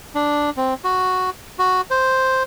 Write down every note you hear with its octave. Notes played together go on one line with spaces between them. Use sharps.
D4
C4
F#4
F#4
C5